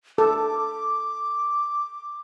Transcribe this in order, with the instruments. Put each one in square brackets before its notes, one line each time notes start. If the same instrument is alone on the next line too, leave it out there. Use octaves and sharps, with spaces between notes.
[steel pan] A4 [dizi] D6